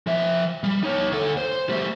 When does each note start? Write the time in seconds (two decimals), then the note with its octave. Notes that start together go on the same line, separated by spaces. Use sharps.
0.07 F3 E5
0.63 G3
0.83 D#4 C#5
1.12 D2 A4
1.37 C5
1.69 G3 A3